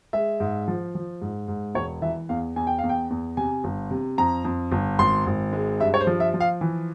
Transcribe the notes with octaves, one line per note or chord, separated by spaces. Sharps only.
G#3 E5
G#2
F3
F3
G#2
G#2
E1 C#5
E3 E5
E2 F5
E2 G#5
G5
E2 F5
G5
E2
C3 G#5
G1
C3
F2 A#5
F2
G1
G#1 C6
G#1
G#3
G2 E5
C#5
C5
F3
E5
F3
F5
E3